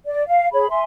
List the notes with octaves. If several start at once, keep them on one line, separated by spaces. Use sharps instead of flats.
D5
F5
G#4 C#5 B5
E5 G#5 C6